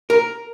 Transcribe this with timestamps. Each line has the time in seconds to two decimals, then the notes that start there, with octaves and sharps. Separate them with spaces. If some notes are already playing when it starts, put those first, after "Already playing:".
0.10 A#4